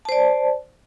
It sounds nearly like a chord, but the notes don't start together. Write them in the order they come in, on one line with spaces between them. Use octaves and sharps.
A5 C5 D5